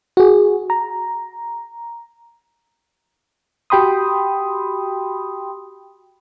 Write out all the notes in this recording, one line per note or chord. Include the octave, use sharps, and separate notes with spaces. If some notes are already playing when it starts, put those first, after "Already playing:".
F#4 G#4
A#5
F#4 G4 G5 B5 C6 D#6